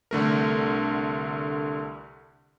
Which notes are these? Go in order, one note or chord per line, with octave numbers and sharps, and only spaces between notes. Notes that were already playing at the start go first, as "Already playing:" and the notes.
C2 D3 A3 A#4